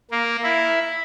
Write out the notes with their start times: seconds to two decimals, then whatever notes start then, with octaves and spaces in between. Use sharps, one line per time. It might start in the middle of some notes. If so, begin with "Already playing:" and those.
0.11 A#3
0.43 E4